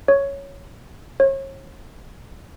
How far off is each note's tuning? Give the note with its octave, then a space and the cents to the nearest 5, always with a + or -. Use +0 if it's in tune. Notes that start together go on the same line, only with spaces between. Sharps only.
C#5 +0
C#5 -40